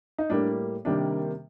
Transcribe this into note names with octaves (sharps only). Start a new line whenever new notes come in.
D#4
A2 G3 A#3 D4
C3 D#3 G3 A#3 D4